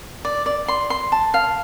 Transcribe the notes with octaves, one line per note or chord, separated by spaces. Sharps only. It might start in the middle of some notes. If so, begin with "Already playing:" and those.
D5
D5
C6
C6
A5
F5